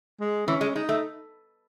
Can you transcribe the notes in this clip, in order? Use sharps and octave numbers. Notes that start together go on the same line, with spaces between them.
G#3
E3 C#4
G#3
G#3 D#4
A3